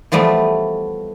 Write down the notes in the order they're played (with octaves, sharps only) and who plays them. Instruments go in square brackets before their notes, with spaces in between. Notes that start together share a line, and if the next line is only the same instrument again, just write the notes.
[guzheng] E3 F3 G3 A3 B3